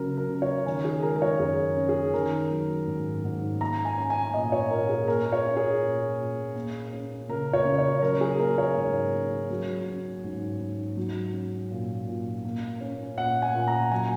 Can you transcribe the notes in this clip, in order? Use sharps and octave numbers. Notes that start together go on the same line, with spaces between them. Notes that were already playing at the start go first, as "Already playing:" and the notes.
Already playing: C#3 F#3 C#4 A#4
A#4
C#3
C#5
D#3 G#5
G#4
G#3 A#4
A#4
C#5
F#2 G#4
C#4
G#4
D#3 A#4
F#3
G#2
G#2
A#3 A#5
G#5
C#4
G#5
A#2 D#5
C#5
A#2 A#4
G#4
A#3 A#4
C#5
C#4
G#4
A#2
A#2
A#3
C#4
C#3 A#4
C#5
C#3
C#5
F#3 A#4
G#4
A#3 A#4
C#5
G#2
C#4
F#3
C#4
G#2
G#2
F#3
C#4
A#2
A#2
A#3
C#4
A#2 F#5
G#5
A#2
A#5
F#3 G#5